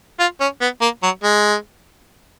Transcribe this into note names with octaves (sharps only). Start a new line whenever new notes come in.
F4
C#4
B3
A#3
F#3
G#3